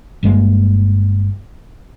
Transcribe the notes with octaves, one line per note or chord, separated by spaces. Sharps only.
G1 G2 G#3 A#3